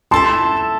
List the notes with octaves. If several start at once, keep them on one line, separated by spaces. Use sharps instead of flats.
E4 A4 E5 A5 C6